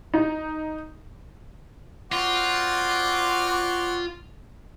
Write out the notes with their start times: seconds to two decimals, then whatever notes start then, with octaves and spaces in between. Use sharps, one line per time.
0.14 D#4
2.12 C4 F4 F#4 D5